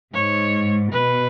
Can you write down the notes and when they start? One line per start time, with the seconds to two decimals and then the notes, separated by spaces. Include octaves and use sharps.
0.13 G#2 C#5
0.92 B2 B4